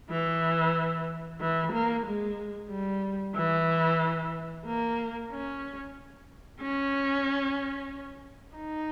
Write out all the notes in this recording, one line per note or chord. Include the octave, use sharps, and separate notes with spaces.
E3
E3
A#3
G#3
G3
E3
A#3
C#4
C#4
D#4